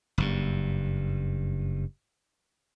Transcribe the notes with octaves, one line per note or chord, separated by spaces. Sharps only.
F#1 G2